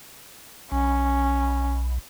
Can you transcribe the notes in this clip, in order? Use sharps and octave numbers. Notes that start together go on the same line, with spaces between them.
B1 C#4